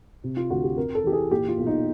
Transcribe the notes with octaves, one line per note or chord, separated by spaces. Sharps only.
C3
F4
D2 F#4
G4
F2 A#4
A4
E3 G4
G#4
A#2 G4
F4
B1
D#4